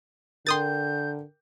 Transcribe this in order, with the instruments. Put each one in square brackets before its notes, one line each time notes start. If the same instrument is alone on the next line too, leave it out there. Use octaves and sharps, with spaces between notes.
[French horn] D3 [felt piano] A#4 G5 [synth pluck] C6 D#6 A6 [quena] G6